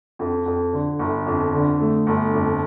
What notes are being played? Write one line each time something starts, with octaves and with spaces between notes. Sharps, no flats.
F2
F2
D3
G1
F2
D3
A3
G1
F2